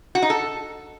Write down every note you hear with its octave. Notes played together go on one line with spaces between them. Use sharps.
F#4
D#4
A4